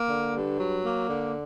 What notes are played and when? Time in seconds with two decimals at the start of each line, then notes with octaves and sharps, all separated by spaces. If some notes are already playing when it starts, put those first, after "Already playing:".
Already playing: A#3
0.09 D3
0.34 G2
0.60 F#3
0.84 A#3
1.10 D3